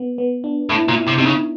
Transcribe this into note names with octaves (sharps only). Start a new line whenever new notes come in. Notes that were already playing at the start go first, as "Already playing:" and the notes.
Already playing: B3
B3
D4
A2 E4
A#2
E4
C3
C3 D#4
C#3